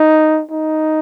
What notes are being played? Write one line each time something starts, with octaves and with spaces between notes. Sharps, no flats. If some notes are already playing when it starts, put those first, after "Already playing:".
Already playing: D#4
D#4